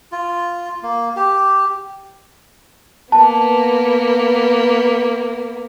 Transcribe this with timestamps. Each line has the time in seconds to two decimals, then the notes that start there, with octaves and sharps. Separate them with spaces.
0.12 F4
0.83 A#3
1.16 G4
3.12 A#3 B3 A5